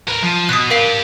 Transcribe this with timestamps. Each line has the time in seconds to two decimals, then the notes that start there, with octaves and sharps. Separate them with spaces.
0.08 A#4 B4
0.23 F3
0.49 B2 D#6 F#6
0.71 G4 A#4 B4 F5 C7